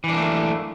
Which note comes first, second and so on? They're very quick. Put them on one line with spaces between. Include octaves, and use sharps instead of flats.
E3 D4 A#3 A3